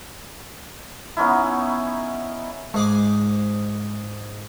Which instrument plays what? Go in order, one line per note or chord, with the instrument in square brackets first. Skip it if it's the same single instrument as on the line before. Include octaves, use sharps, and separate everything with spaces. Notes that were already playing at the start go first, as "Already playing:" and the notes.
[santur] B3 C#4 D#4 E4
[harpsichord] G#2 G#4 D6 [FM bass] G#3